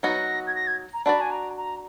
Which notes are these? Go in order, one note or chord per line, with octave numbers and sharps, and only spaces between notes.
F#3 B3 D#4 F#4 A#6
G#6
A#6
G#6
A#5
D4 F#4 D5 B5
G#5
A#5
A#5